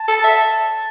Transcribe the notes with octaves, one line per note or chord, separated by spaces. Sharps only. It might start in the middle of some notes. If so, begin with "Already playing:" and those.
Already playing: A5
A4
E5